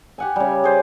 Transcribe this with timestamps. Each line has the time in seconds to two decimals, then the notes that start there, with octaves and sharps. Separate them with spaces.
0.18 G4 F#5 G#5
0.36 C#3 G3
0.64 G#4 C5 D5